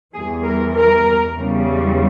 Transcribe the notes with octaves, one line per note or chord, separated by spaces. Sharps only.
E2 E3 G3 G#4
A#4
A#4
E2 C#3 G3